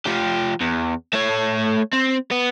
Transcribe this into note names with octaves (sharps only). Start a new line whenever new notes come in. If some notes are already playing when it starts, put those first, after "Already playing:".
F3 G4
E2
A3 C#5
C4
B3